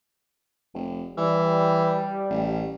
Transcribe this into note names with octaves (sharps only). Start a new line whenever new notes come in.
F1
E3 G3
A1